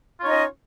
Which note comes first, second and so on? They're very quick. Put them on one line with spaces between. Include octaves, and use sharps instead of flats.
F4 C#5 D#4 D#5 C#4